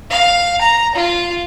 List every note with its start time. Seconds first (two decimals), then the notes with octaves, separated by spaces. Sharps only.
0.10 F5
0.61 A#5
0.95 F4